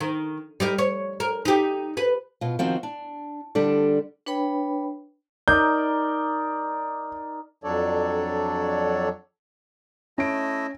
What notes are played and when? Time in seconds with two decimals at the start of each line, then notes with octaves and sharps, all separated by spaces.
0.01 D#3
0.60 G3 D#4 A#4
0.78 C#5
1.20 A#4
1.45 D#4 G4
1.97 B4
2.41 B2 F4
2.59 D#3 F3 C4 D#4 F#4 F5
2.83 D4
3.55 D3 G3 D4 A4
4.26 D4 B4 C#5 G5 B5
5.48 D#4 A#4 D5 G6
7.64 F2 F#3 D4 A4 C#5 D5
10.18 A3 C#4 E4 D#5 D7